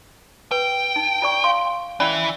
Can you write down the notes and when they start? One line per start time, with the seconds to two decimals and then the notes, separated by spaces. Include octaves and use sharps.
0.51 B4 G5
0.96 D#4
1.22 F4 D5 C#6
1.44 F5 C6
2.00 E3 C#4 E4 D5 B5